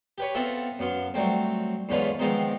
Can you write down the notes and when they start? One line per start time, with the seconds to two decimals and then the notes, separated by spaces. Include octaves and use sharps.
0.18 G4 B4 C#5
0.35 B3 C4 F4 A4 E5 F#5
0.79 F#2 B3 F5 C6
1.14 F#3 G3 A3 C4
1.89 E2 G#2 D3 C#4 F4 B4
2.19 D#3 F3 G#3 B3 C4 D#4